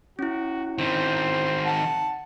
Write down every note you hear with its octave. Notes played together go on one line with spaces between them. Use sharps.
C#4 E4 F#4
D#3 C4 C5
F#5 A5